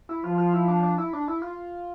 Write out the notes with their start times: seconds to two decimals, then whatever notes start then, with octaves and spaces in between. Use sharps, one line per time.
0.09 E4
0.24 F3 F4
0.38 F4
0.53 E4
0.68 D4
0.83 D4
0.98 E4
1.13 D4
1.28 E4
1.42 F4